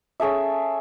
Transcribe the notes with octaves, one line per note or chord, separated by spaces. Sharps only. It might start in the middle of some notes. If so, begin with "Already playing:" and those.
C#4 G#4 A4 E5